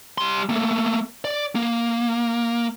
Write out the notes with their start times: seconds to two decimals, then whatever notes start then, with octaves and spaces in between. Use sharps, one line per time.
0.18 G3 C6
0.49 A3 A#3
1.25 D5
1.55 A#3